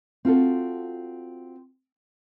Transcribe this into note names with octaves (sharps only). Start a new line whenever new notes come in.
C4 F4 F#4 A4